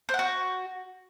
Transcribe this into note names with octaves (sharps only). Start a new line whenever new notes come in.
C5
F#5
F#4